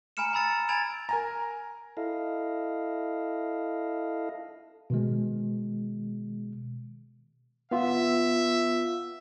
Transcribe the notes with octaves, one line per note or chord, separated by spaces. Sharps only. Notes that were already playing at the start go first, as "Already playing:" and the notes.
G#5 A#5 B5 F6 C#7 E7
G#5 A#5 B5 E6 A6 C#7
G#5 B5 G#6 A6 D7 F7
A#4 G#5 A#5
E4 A4 D#5 F5
B2 D#3 G#3
B3 F4 E5